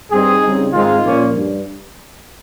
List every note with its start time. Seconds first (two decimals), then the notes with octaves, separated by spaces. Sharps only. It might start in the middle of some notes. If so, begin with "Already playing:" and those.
0.11 G2 G3 C4 D#4 G#4
0.42 C#3 G3 C4 D#4
0.72 G#2 D#3 G#3 C4 D#4 F4
1.03 A#2 F3 A#3 C#4
1.34 G2